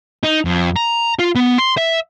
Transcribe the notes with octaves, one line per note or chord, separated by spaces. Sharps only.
D#4
F2
A#5
F4
B3
C6
E5